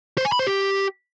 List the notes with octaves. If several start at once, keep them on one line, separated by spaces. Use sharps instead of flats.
C5
G#5
B5
C5
G4